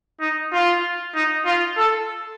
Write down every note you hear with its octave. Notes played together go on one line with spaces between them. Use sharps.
D#4
F4
D#4
F4
A4